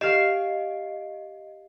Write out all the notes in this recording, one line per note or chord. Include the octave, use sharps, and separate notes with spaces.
G4 D#5 F5 C7 E7